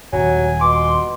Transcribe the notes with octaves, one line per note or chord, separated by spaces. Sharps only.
D#1 F#3 G#5
B2 C6 D6